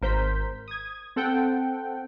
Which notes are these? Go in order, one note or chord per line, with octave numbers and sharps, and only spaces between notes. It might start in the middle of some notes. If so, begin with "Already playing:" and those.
G#1 A#4 C5 G6 B6
D#6 G#6
C4 A4 F#5 G5